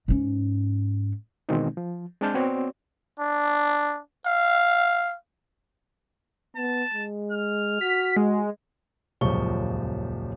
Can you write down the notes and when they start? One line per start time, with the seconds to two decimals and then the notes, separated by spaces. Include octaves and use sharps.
0.08 G#2 C#4
1.49 B2 D#3 E3 G#3 C4 D#4
1.77 F3
2.21 G#3 C4 D4 A5 F6 G6
2.34 B3 C4 F#4 C#5 D5
3.19 D4
4.26 F5
6.56 B3 A5
6.94 G#3
7.32 F6
7.81 F#4 B6
8.17 G#3
9.21 D#1 C#2 F#2 F3 C#6 G7